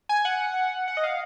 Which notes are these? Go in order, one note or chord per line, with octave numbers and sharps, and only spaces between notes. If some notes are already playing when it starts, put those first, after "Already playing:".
G#5
F#5
F#5
D#5
F5